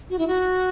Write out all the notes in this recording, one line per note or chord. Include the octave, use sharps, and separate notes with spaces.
F#4
E4
F#4